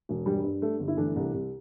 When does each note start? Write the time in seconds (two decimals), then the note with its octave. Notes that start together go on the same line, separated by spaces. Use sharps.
0.09 E1
0.26 G2 G3
0.44 G2
0.62 G2 A3
0.80 G1
0.88 E4
0.97 E3 A3 D4
1.16 C2
1.34 C2